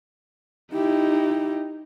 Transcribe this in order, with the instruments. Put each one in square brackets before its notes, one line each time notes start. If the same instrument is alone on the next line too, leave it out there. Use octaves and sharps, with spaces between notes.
[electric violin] D#4 [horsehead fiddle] E4 G4